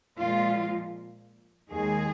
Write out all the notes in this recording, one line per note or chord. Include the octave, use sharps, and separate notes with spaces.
A#2 F3 G#3 F4
D#2 D#3 G#3 G#4